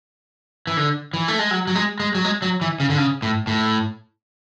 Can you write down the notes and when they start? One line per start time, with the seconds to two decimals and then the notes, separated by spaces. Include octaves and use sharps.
0.67 E3
0.77 D3
1.14 E3
1.28 A3
1.39 G#3
1.51 F#3
1.67 F#3
1.75 G#3
2.00 G#3
2.15 F#3
2.25 G#3
2.42 F#3
2.61 E3
2.80 C#3
2.90 D3
2.98 C#3
3.22 A2
3.47 A2